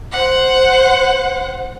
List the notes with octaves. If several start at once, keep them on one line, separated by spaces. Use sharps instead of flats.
C5 F#5